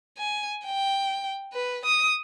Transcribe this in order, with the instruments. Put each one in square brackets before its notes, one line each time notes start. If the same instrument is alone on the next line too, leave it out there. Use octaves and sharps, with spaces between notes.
[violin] G#5
G5
B4
D#6